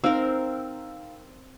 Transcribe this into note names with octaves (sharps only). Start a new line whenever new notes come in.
C4 D#4 A#4 F5 E6